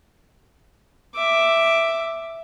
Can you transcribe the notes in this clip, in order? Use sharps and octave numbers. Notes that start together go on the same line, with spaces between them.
E5 D6